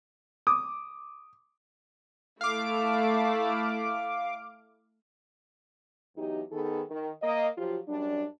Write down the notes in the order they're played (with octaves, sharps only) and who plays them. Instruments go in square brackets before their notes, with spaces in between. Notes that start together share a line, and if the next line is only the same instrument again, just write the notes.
[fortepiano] D6 D#6
[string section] A3 E4 [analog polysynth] F5 D6
[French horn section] E2 F#3 D#4 G4
D#3 B3 D#4 G#4 A4
D#3
A#3 D#5
F3 F#3 F4 G4
F#2 G3 D4